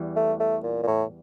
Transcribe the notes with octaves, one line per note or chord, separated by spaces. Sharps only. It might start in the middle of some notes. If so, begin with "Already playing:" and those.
Already playing: E2 E3 G3
A3
A3
A#2
A#2
A2